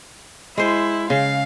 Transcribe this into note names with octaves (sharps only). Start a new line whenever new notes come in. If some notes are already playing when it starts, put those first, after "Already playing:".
G#3 E4 C5
C#3 F5